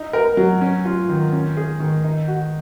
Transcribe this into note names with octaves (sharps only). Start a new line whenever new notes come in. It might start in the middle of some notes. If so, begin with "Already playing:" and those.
Already playing: D#4
A#4
F#3
C#4
F4
D#3
C#4
G#4
D#3
D#4
F#4